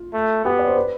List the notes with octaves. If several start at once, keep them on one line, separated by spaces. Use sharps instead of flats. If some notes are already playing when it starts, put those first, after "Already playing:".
Already playing: F4
A3
B3 G4
D5
C5
B4